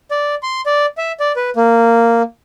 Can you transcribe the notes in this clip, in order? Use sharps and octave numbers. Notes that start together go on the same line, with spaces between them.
D5
C6
D5
E5
D5
B4
A#3